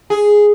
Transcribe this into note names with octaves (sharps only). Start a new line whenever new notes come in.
G#4